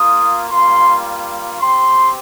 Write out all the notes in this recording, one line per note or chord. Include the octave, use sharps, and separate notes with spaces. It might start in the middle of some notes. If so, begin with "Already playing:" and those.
Already playing: A#3 F4 D#6
G3 A#3 F4 C6
C4 G4 C6